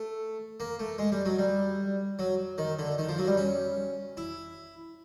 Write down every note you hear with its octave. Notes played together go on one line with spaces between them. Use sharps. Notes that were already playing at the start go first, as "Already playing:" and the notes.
Already playing: A3
A#3
A3
G#3
G3
F#3
G3
F#3
D#3
D3
D#3
F3
F#3
G3
C#4
E4